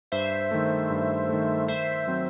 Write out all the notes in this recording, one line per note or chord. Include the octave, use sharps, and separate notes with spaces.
G2 C5 E5
D#3 A3
G2
D#3 A3
D#3 C5 E5
F#3 C4